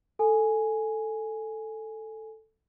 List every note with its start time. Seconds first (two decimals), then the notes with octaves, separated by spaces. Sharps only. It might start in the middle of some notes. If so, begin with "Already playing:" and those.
0.19 A4 G#5